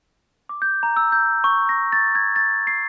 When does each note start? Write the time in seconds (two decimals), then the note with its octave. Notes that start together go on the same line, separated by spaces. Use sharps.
0.49 D6
0.62 G6
0.83 A#5
0.97 E6
1.12 G6
1.44 C#6
1.69 A#6
1.92 A6
2.15 G#6
2.36 A6
2.67 C7